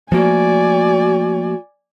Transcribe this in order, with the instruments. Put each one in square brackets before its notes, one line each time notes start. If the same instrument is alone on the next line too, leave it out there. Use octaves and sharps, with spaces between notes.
[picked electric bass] F3 A3 A#3 [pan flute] F#4 [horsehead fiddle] D5 G#5